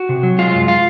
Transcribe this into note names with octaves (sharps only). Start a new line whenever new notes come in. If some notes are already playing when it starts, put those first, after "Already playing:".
Already playing: F#4
C3
F#3
G#3 F4
F#2
F4